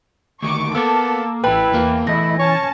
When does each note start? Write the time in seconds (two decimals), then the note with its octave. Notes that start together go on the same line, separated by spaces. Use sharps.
0.43 D2 D#3 C#6 D6
0.75 A#3 B3 A4 D6 E6
1.44 A1 E4 B4 G5 A5 B5
1.74 E2 E3 A#3
2.07 E2 A3 E4 D#5 A#6
2.39 C#4 C#5 G#5 A5